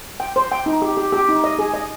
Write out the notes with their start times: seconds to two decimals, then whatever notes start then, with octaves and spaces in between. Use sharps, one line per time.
0.20 G5
0.36 C5
0.52 G5
0.66 D#4
0.82 G4
0.97 G4
1.12 G4
1.28 D#4
1.44 D#5
1.59 G#4
1.74 D#5